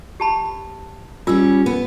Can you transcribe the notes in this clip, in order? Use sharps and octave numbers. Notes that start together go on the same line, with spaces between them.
G4 A5 B5
G3 C#4 F4 E6
B3